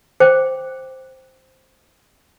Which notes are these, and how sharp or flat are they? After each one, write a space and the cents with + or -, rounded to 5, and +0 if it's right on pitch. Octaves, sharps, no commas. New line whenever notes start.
C5 +0 G5 +0 D6 +0